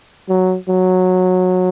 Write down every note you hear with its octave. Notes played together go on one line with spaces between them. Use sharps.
F#3
F#3